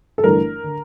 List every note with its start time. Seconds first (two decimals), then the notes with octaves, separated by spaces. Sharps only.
0.18 A4
0.24 G1 G2 E3 A3 D4 A#4
0.64 D3